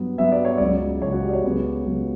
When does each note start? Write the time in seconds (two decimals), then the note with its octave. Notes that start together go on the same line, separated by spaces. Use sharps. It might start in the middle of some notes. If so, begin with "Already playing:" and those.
Already playing: G2 F#3 B3
0.18 G2 F#3 B3 E5
0.32 D5
0.45 C#5
0.58 C#2 C#3 F#3 D5
1.02 C#2 C#3 F#3 C#5
1.12 F#4
1.23 G4
1.29 D5
1.34 C#5
1.44 C#2 C#3 F#3 B3
1.86 C#2 C#3 F#3 B3